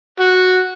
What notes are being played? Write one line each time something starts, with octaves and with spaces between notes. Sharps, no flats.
F#4